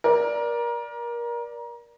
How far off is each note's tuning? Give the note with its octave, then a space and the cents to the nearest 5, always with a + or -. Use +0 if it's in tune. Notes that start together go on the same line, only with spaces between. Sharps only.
A#4 +25 D5 +0